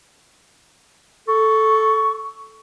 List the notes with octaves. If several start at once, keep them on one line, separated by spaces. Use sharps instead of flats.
A4 C#6